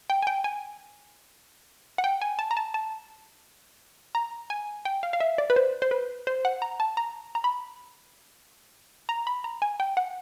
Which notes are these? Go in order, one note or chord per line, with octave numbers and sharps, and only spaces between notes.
G5
G#5
G5
G#5
F#5
G5
G#5
A5
A#5
A5
A5
A#5
G#5
G5
F5
F5
E5
D5
B4
C5
C5
B4
C5
F#5
A#5
A5
A#5
A#5
B5
A#5
B5
A#5
G#5
G5
F#5